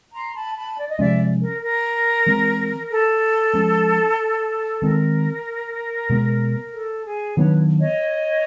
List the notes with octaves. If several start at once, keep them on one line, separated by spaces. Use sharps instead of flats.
A#5 C6
A5 B5
A5 B5
D5
D#5
C3 F3 G#3 C#4 D5 E5
A#4
A#4
E3 G#3 C4
A4
F3 G#3 C#4
D#3 G#3 C4 A#4
B2 G#3 B3
A4
G#4
D#3 F#3 B3 D4 B4 C#5
C#5 D#5